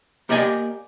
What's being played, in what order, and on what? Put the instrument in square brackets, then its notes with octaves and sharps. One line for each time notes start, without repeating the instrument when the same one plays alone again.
[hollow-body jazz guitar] A#3 G4 D5 D#5 G#5